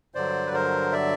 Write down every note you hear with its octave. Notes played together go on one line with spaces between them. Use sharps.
G2 D3 F#3 C5 D5
B4
A#4 C5
D5 E5